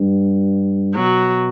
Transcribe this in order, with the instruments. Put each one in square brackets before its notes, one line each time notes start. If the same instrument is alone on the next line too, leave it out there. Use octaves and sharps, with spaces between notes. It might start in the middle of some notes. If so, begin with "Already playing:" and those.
Already playing: [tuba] G2
[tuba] B2 [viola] F#3